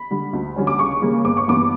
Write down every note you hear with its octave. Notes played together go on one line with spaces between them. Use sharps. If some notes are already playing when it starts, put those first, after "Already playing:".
Already playing: B5
D3 G3
D2
D3 G3 C#4
D6
C#2 C#6
C#3 G3 A#3
G1 D6
C#6
G2 E3 B3 D6